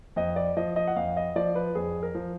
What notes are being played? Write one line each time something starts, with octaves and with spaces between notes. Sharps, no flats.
F2 D#5
D5
F3 D#5
D#5
F#5
F2 F5
D#5
F3 D5
B4
F2 G#4
A#4
F3